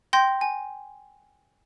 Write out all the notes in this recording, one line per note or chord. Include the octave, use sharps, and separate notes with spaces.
G5 C6 G6 A#6
G#5